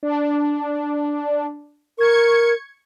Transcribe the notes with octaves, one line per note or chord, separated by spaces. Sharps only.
D4
A#4 C#6 G#6 C#7